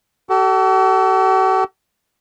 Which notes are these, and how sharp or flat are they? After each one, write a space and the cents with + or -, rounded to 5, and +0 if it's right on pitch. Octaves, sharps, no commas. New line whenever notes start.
F#4 +45 A4 +0